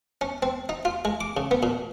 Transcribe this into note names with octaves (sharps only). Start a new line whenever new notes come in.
C#4
C4
D#4
F4
G#3
D6
C#3
B3
A#2